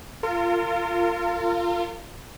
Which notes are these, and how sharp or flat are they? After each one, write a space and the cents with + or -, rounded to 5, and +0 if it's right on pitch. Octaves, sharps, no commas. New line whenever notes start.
F4 -10 A#4 -40